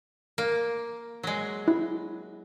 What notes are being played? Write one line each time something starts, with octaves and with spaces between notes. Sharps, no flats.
A#3
F#3 G#3
E4